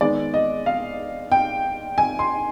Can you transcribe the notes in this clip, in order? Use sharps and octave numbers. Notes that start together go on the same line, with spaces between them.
D#3 G#3 B3 D5
D#5
F5
G5
G#5
C6